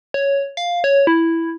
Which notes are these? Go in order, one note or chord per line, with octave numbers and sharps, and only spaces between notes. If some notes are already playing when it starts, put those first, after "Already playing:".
C#5
F5
C#5
E4